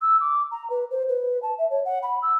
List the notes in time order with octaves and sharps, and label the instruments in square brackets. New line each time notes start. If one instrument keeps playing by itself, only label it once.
[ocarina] E6
D6
A#5
B4
C5
B4
A5
E5
C#5
F#5
B5
E6